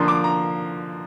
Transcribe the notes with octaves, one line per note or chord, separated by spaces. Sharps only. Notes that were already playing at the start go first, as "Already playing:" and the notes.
Already playing: D3 F3 A#3 A#5 C6
D6
A#5